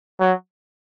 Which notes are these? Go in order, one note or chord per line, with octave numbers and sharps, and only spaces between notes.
F#3